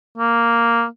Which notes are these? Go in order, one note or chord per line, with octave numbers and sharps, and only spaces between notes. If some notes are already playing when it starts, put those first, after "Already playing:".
A#3